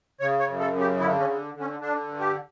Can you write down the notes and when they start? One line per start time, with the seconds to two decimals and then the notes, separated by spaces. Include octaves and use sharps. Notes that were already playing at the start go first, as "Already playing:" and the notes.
0.20 C#3 C#5
0.40 C#5
0.47 F#2
0.60 A4
0.73 C#3
0.80 G4
1.00 D3 E4
1.20 C#4
1.27 D3
1.54 D3
1.60 C#4
1.80 D3 D4
2.08 G2
2.20 G4